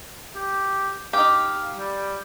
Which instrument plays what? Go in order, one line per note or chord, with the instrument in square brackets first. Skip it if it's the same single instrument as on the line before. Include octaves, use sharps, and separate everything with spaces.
[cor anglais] G4
[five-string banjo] D#4 G4 [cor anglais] F5
[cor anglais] G3